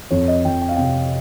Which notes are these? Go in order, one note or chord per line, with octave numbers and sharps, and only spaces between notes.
F2 C#5
D#5
F2 G5
G5
F5
C3 G5